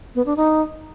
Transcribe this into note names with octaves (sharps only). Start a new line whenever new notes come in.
B3
D4
D#4